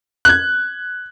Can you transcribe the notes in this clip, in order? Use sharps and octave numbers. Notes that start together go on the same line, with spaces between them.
F#6 G#6